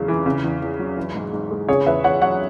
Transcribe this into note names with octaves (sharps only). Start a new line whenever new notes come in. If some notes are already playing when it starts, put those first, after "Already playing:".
Already playing: E2 C#3 F#3 G#3
E3
C#3
E2
E2
F#3
E3
G#2
G#2
G#3
C#3 G#4 C#5
E2 B4 E5
E2 C#5 F#5
F#3 C#5 F#5